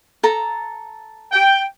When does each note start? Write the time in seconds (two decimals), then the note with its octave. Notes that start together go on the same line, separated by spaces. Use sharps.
0.23 A4 A#5
1.32 G5